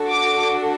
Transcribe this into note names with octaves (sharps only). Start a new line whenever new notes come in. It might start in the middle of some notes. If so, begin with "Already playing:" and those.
Already playing: D4 F#4 A4
D6